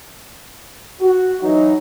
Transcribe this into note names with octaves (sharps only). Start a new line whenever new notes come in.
F#4
E3 F#3 D#4